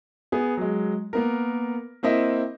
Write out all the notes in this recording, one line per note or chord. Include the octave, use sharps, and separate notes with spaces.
B3 G#4
F#3 G#3
A#3 B3 A#4
A#3 C4 E4 D#5 E5